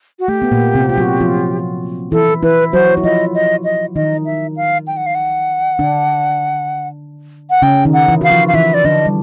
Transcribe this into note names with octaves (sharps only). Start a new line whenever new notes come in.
F#4
A3 G4
B3
A#2 A#3
C3 C4
F4
F#3 F#4
F3 F4
E3 E4 A4
E3 E4 B4
F#3 F#4 C5
E4
F3 F4 D#5
D#5
D#5
D#3 D#4 D#5
E5
F5
G5
F#5
F5
F#5
D3 D4
F#5
C#3 C#4 G5
D#3 D#4
F#5
E3 E4
F#4 F5
F3 F4
F5
E3 E4 E5
D5
D3 D4 D#5
G3